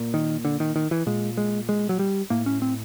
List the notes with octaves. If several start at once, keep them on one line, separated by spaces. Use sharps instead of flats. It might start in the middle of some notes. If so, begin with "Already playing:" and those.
Already playing: A#2
D#3
D3
D#3
D#3
E3
A#2 G#3
G#3
G#3
F#3
G3
A2 A#3
C#4
C4